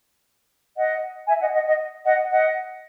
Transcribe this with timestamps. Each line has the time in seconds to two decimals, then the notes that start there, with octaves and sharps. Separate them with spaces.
0.77 D#5 F#5
1.28 E5 G#5
1.41 D#5 F#5
1.54 D#5 F#5
1.66 D#5 F#5
2.05 D#5 F#5
2.30 D#5 F#5